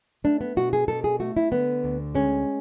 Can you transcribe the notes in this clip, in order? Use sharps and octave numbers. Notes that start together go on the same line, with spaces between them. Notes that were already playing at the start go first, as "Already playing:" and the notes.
A3 D4
B3
B2 F#4
G#4
B2 A4
G#4
A3 F#4
E4
D3 B3
D2
G#3 C#4